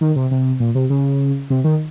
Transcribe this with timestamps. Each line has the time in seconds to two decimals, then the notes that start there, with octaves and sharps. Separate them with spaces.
0.01 D#3
0.16 C3
0.31 C3
0.60 A#2
0.75 C3
0.90 C#3
1.50 C3
1.64 D#3